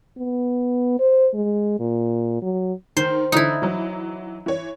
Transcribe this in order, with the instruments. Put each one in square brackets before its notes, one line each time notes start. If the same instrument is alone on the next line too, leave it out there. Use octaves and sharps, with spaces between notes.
[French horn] B3
C5
G#3
A#2
F#3
[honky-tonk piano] D#3 [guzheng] C5
[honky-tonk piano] D3 E3 [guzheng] D#4 E4
[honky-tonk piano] E3 F#3
E3 C#5